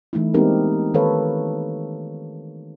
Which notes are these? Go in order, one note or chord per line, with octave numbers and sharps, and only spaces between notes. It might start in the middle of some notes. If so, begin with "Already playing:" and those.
E3 A3 D#4 E4
G#3 B3 C4 D#4 G4 A#4
D#3 A#3 A4 B4 C#5 F5